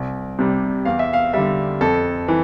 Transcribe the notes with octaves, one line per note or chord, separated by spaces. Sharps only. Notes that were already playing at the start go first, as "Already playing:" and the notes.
Already playing: C2
C3 G3
E2 F5
E5
F5
D3 G3 E5
F2 A4
E3